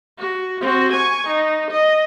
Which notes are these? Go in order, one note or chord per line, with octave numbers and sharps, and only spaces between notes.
F#4
C4 F#4
G#5 C#6
D#4
D#5